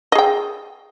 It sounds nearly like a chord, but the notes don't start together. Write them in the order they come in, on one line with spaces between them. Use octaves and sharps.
D#5 G#4 G5